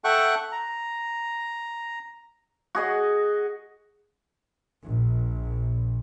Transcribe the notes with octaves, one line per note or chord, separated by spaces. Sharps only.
A4 E5 F#5 G5 C#6 F#6
A#5
F#4 G#4 D#5
A#1